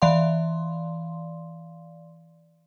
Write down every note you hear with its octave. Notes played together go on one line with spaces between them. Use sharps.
E3 D5 F5 C6